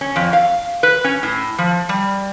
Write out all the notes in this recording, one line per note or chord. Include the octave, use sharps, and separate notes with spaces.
C#4
F2
F5
B4
C#4
A2
F3
G3